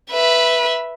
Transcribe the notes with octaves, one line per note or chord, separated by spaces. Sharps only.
B4 E5